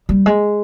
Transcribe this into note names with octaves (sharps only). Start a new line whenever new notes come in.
G3
G#3